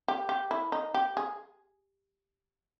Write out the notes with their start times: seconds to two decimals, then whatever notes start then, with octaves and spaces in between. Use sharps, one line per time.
0.08 G4
0.29 G4
0.51 E4
0.72 D#4
0.94 G4
1.17 G#4